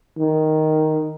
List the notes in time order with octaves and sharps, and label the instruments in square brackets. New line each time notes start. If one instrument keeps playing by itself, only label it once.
[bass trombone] D#3